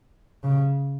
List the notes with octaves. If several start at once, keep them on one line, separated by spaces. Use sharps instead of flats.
C#3